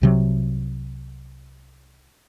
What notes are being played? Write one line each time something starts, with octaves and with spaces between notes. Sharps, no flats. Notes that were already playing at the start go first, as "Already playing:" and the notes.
C2 C3 F#3